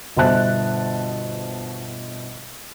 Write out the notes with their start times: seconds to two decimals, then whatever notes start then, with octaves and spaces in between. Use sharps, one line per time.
0.16 G1 B2 C5 E5 A5 F#6